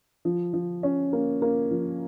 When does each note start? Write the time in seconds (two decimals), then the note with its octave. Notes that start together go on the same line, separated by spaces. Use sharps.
0.25 F3
0.53 F3
0.83 C#4
1.13 A#3
1.42 A#3
1.71 F3